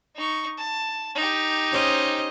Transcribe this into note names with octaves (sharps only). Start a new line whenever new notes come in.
D#4 C#6
A5
D#4 G4
C#4 C5 D#5